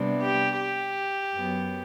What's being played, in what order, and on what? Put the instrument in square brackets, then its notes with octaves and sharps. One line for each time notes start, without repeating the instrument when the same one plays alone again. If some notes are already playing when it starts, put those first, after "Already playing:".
Already playing: [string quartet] C3 G3 B3 D4
G4
G4
F#2 F#3 B3